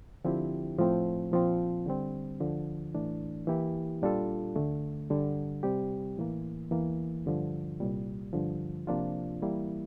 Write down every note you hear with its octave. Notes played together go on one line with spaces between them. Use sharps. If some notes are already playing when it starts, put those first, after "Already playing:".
D3 F3 C4 E4 G4
A2 F3 A3 C4
A#2 F3 C4
D3 G3 C4
D2 D3 F3
A2 E3 A3 D4
E3 A#3 E4 G4
A#2 G3 D4 F4 A4
D2 D3 A3
G2 D3 G3
C3 G3 C4 G4
A2 E3 A#3
E2 E3 A#3
G2 D3 F3
C2 A#2 G3
G2 D3 F3
C3 F3 A#3 D4 F4
E3 G3 A#3 E4